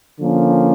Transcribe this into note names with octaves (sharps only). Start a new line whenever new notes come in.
D3 F3 A#3 C#4